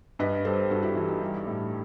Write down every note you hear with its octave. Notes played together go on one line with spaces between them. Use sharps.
G2 B4 D#5
G3 A4 C5
G2 F#4 A4
E4 G4
E3 E4
D#4
G3
A2